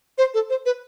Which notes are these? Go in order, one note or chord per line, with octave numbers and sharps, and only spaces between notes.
C5
A4
C5
B4